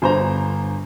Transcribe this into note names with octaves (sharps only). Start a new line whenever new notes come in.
G1 C5 A#5